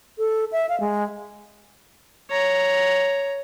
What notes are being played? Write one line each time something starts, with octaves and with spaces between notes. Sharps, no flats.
A4
E5
F5
G#3
C#5 A#5